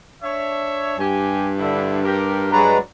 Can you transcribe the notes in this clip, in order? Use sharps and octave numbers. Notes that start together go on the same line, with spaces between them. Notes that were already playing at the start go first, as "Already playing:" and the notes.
D4 C#5 E5
G2 G4 G#5
D3 E4
G4 A#4
F#3 G#3 D4 F#4 B4 A#5